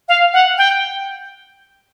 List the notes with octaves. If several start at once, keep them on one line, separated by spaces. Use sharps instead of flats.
F5
F#5
G5